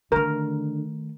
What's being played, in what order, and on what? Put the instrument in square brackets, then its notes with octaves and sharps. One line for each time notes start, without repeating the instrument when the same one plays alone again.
[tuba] D3 [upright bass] D#3 A3 [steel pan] A#4